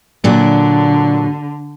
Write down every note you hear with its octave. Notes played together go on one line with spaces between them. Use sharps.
A#2 D3 F#3 D4